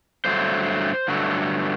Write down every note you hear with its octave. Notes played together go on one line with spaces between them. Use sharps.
G2 D3 F#3 A3 C5
G2 D3 F#3 A3